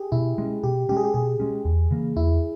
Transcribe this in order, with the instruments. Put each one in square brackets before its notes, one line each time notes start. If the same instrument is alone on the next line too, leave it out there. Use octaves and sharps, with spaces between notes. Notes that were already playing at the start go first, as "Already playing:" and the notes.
Already playing: [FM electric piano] G4 G#4
[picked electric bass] B2 [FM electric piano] E4
[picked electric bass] G#3 C#4
[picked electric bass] B2 [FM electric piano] G4
[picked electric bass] G#3 C#4 [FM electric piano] G4
[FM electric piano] G#4
G4
[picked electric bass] B2 [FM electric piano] G#4
[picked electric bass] G#3 C#4
E2
C#3 E3 A#3
[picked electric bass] E2 [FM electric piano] E4